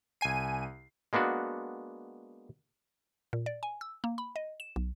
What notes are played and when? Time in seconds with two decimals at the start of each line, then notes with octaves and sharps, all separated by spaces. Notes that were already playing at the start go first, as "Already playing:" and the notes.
0.21 C2 G#5 C7 D#7
1.13 G#3 A#3 B3 D4 F#4
3.33 A#2
3.46 D5
3.63 G#5
3.81 E6
4.04 A#3
4.18 B5
4.36 D#5
4.60 E7
4.76 B1